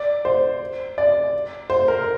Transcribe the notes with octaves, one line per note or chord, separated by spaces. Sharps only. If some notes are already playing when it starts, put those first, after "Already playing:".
Already playing: D5
C5
D5
C5
A#4